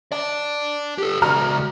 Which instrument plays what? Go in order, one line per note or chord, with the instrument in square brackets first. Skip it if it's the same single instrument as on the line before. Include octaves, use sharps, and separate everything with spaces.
[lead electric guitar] D5 A5
G4 A4
[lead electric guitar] C#2 F#4 [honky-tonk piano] A#5 F6